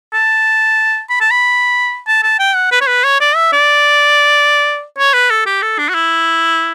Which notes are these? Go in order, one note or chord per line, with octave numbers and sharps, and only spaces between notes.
A5
B5
A5
B5
A5
A5
G5
F#5
B4
C#5
B4
C#5
D5
E5
D5
C#5
B4
A4
G4
A4
D4
F#4
E4